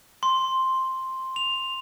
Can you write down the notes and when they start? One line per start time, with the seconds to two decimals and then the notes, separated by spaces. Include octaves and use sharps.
0.23 C6
1.36 F7